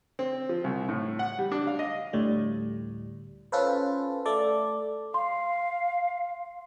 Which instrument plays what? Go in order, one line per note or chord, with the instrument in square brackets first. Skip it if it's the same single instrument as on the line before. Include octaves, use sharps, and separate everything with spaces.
[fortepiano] C4
F3
C2
A2
F#5
G3
D4
F5
D#5
[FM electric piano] D2 A2 G3
C#4 F4 A4 B4 C5
A3 A4 D5
[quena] F5 [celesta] C6